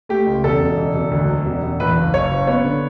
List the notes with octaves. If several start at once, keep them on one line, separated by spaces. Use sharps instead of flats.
A3 G4
C#2
E1 A4
E1
E1
E1
D2
F#3
E1
E1
E2 B4
F#1
F#1 C#5
F#1
B3 C#5
D3